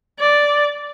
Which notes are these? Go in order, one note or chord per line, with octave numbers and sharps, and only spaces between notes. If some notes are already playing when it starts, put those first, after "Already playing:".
D5